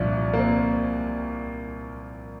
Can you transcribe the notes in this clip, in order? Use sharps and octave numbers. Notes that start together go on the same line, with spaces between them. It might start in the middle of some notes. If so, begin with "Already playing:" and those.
Already playing: C2 A#2 F3 D4
A#3
C4